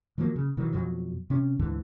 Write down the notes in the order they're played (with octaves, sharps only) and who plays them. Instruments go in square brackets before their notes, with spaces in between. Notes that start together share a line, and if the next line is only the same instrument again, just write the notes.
[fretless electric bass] D#3 F3 F#3 A#3
C#3
B2 D#3 E3 F#3
F2 B2 F3 F#3
C3 C#4
D2 G#2 D3 E3